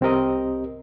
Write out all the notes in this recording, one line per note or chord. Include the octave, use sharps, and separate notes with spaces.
C2 C4 G4 A#4 D#5